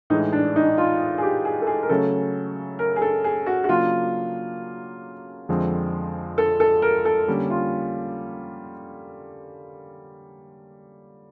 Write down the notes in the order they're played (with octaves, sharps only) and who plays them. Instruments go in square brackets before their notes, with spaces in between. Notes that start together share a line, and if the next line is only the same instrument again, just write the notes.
[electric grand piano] A2 E3 G#3 [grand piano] D#4
[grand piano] D4
D#4
F4
G#4
G4
G#4
A4
G#4
A#4
[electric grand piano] C#3 F#3 A3 C#4 [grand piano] A4
[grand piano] A#4
G#4
A4
G#4
F#4
F#4
[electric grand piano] C#3 F#3 A#3 D4 [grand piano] F4
[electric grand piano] F2 D3 F3 G#3 C4
[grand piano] A4
A4
A#4
A4
[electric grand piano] D3 G3 A#3 C#4
[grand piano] F4